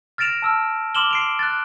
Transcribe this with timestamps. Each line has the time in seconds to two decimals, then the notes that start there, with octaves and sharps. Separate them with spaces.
0.18 F6 A6 A#6 D7 E7 F7
0.42 A5 E6 F6
0.95 C6 D6 F6 E7 F#7 G7
1.11 C7 D7 F7
1.39 F#6 A6